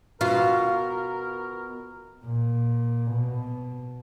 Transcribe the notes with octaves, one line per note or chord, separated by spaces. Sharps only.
B2 F4 A#4
A#2
B2